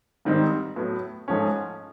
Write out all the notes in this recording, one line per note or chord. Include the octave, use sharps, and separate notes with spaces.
G#2 D#3 G3 C4 D#4
A2 F#3 B3
G#2 F3 A3 C#4